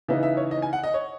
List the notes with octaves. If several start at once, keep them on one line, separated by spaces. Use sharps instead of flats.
C#3 E3 B3 D#4 E5
E5
C#5
D#5
G#5
F#5
D#5
C#5